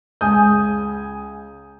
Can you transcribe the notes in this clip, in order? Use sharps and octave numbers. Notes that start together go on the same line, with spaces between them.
C#2 G#5 D#6 G6